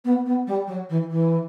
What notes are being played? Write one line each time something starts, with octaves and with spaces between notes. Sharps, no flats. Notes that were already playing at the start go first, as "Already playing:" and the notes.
B3
B3
G3
F#3
E3
E3